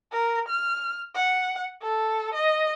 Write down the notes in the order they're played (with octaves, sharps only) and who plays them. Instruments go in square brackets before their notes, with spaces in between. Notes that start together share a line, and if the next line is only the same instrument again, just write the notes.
[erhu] A#4
F6
F#5
A4
D#5